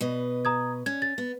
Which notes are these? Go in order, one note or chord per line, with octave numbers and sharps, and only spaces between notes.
B2 B4 D#5
A#5 D#6 G#6
C#4 G#6
A6
B3